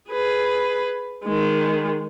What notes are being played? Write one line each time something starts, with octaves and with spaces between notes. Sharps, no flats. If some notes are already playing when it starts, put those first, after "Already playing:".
G#4 B4
D#3 G#3